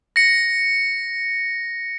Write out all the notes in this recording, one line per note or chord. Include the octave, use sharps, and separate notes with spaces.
A#6 C#7